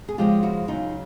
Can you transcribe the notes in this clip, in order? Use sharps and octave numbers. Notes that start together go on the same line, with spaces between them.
G#4
C#3 F3 G#3 F4 G4
E4 F#4
C#3 F#3 D#4 F4